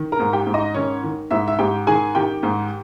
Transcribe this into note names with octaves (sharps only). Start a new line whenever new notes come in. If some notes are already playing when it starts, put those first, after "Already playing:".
Already playing: D#3
A#4 A#5
G#2
G4 G5
G#2
D#4 D#5
D#3 C#4 C#5
D#3
G#2 E4 E5
E5
G#2 G4 G5
D#3 G#4 G#5
D#3 G4 G5
G#2